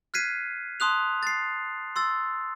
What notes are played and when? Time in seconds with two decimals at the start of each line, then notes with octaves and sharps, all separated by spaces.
0.14 F6 F#6 G#6 B6 C7 D#7
0.80 A5 C6 D#6 F#6 F7
1.23 A6 C7
1.96 C6 E6 A6